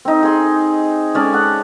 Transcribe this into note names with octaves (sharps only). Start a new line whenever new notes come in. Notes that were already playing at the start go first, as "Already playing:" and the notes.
C4 D#4
G#4 C6
G#3 C#4 D5 A5
F#5